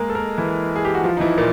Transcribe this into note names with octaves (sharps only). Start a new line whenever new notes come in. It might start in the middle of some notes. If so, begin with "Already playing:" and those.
Already playing: G#3 A#3 G#4 A#4
A4
A#3 A#4
E3 E4
G#4
G4
F#4
F3 F4
D#4
E3 E4
A#2 A#3